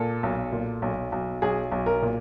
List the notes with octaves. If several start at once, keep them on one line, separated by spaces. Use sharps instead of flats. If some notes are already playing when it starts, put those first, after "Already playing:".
Already playing: A#2 A4
B1
A#2
B1
B1
B1 G#4
B1
A#4
A#2